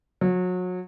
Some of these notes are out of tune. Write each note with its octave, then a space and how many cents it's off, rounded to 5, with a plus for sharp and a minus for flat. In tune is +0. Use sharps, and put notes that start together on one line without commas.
F#3 -30